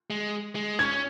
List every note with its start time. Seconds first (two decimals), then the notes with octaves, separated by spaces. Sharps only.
0.10 G#3
0.55 G#3
0.79 C#4 G#6